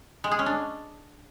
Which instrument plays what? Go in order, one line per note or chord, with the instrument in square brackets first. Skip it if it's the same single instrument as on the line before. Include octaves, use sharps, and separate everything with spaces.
[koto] G#3
G#4
C#4
D4